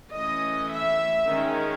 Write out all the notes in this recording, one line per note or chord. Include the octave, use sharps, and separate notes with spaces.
E3 A3 C#4 D#5
E5
D#3 G#3 C#4